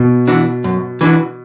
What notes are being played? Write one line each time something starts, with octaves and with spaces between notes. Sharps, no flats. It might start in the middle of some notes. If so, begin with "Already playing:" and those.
Already playing: B2
E3 D4 F#4
F#2
E3 D4 F#4